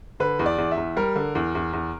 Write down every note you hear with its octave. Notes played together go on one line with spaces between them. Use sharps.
D3 B4
E2
D5
E2
E5
E2
G3 A#4
D3
E2
E2
E2